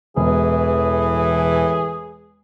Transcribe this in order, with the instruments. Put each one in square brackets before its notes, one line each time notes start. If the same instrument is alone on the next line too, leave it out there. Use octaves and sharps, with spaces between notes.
[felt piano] E1 [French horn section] A2 E3 [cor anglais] G#4